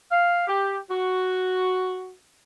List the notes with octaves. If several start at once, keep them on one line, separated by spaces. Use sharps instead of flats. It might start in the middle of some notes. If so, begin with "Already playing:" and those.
F5
G4
F#4